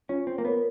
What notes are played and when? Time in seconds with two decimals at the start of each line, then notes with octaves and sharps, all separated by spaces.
0.09 C#4 F4
0.27 C4
0.38 A#3
0.45 B3 A#4 C#5